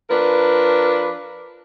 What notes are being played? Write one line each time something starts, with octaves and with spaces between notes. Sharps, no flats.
F3 D4 A#4 B4